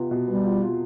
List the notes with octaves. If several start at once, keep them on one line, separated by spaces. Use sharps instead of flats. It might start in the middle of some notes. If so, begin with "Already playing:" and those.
Already playing: C3 B3 F4
B2
G3 B3
F4
F4